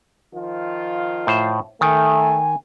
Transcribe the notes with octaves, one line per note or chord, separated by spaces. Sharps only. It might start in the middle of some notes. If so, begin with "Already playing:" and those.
D#3 F3 F4
A2 C5
D#3 A3 G#5